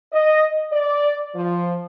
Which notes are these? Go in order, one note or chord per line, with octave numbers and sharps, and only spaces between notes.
D#5
D5
F3